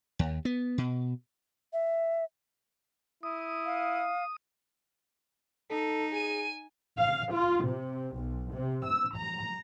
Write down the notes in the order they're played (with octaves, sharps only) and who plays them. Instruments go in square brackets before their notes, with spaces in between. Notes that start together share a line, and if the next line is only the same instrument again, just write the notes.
[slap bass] D#2
B3
B2
[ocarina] E5
[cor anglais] E4 [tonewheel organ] D#6
[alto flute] F5
[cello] D#4 [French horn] A4
[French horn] G#4 [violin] G#5 D#7
[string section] F5
F4
C3
B1
C3
E6
A#5